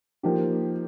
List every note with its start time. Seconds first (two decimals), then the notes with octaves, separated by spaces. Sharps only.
0.23 F3 A#3 D#4 G4